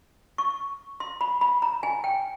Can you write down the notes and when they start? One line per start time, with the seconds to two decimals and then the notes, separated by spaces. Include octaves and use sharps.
0.38 C#6
1.00 C6
1.21 B5
1.41 B5
1.62 A#5
1.83 G#5
2.04 G5